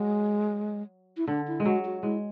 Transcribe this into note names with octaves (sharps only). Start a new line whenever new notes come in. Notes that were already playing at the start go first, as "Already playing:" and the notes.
Already playing: F#3 G#3
E4
D3 D4
E4
G#3
F#3 F#4
F#4
G#3 E4